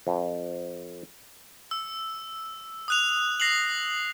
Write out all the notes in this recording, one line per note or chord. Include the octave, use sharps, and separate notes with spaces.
F2
E6
D#6 F#6 F7
A#6 C7 F7 F#7